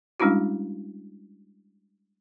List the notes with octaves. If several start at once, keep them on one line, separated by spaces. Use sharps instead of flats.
G3 G#3 C#4 D4 E4 F#4